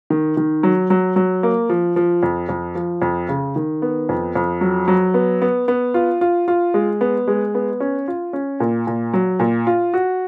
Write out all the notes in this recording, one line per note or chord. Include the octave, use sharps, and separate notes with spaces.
D#3
D#3
F#3
F#3
F#3
A#3
F3
F3
F2
F2
F3
F2
C#3
D#3
B3
F2
F2
F#3
F#3
B3
B3
B3
F4
F4
F4
G#3
B3
G#3
B3
C#4
F4
C#4
A#2
A#2
F#3
A#2
F4
F#4